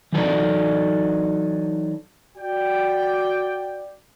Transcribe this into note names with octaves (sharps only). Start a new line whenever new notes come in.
E3 F#3 D#4 A4 B4 D5
F#4 D5 G5